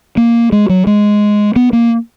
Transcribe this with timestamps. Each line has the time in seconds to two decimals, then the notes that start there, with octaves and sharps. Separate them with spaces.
0.17 A#3
0.52 G#3
0.69 F#3
0.87 G#3
1.56 B3
1.73 A#3